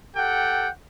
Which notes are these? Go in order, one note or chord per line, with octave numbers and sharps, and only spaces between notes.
G4 A4 F#5 G5